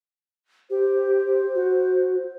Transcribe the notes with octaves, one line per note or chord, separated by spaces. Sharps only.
G4 C5
F#4